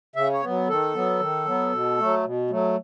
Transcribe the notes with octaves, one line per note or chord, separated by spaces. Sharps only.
C#3 E5
C#5
F#3 B3
D#3 A4
F#3 B3
D#3
F#3 B3
B2
F#3 A3
B2
F#3 A3